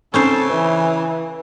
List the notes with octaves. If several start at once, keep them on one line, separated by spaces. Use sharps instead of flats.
C#3 C4 C#4 D#4 A4 C5
E3 B4